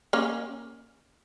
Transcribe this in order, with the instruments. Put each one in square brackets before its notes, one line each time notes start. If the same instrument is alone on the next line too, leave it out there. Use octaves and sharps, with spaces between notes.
[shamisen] A#3 C#4